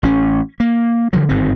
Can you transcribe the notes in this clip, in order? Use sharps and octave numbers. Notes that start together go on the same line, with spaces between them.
A1 C#4
A#3
D3 F3 F#3
G1 G#2 D#3 C4